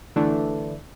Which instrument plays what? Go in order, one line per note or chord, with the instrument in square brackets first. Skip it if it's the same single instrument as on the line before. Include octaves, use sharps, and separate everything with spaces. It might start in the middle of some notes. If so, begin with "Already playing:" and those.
[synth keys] D3 E3 A3 D4